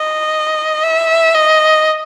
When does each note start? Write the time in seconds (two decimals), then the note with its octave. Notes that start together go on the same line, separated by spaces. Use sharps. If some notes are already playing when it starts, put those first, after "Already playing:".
Already playing: D#5
0.84 E5
1.34 D#5